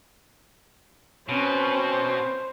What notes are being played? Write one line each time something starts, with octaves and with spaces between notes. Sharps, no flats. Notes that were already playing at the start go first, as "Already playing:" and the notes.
B2 C4 C#4 C5